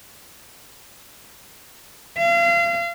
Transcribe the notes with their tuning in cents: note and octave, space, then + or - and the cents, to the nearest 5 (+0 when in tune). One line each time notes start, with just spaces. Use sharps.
F5 -35